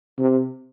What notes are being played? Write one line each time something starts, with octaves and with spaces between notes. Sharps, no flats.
C3